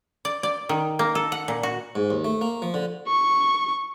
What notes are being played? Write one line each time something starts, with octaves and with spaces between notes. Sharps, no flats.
D5
D5
D#3
A#3
A4
F#5
A#2
F#4
G#2
D#2
A3
A#3
F3
D3
C#6